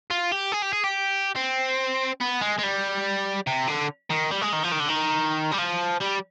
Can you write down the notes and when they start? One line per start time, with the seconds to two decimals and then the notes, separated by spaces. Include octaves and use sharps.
0.10 F4
0.31 G4
0.52 G#4
0.62 G4
0.73 G#4
0.84 G4
1.36 C4
2.21 B3
2.41 G#3
2.59 G#3
2.63 G3
3.47 C3
3.68 D3
4.10 D#3
4.31 G3
4.42 G#3
4.53 D#3
4.63 F3
4.72 D#3
4.80 D3
4.89 D#3
5.51 G3
5.58 F3
6.00 G3